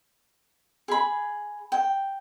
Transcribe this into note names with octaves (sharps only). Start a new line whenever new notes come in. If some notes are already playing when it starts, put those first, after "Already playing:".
G#4 B5
G5